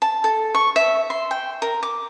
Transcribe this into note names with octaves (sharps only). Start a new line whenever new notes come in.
A5
A4
C#6
E5
C6
G5
A#4
D6